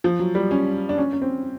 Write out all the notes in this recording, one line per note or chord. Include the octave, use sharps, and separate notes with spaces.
F3
F#3
G3
C#4
D4
C#4
C#4
C4